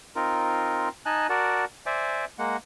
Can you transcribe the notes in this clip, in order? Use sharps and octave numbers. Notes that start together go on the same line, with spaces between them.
C4 D#4 F4 A#4
D#4 D#5 G#5 A5 F#6
F#4 A#4 D5 F#5 A5
C5 D5 E5 G#5 D6
G#3 A#3 F#5